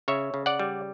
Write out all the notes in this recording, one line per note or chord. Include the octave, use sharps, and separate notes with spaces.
C#3 C#5 E5
C#3
D5 F#5
G3